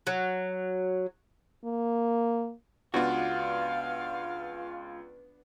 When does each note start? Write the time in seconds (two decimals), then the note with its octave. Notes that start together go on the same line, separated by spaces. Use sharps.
0.07 F#3
1.64 A#3
2.94 C#2 B3 D4 F4 F#4 F5